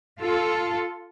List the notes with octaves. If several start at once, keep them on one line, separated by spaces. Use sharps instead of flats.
F4 A4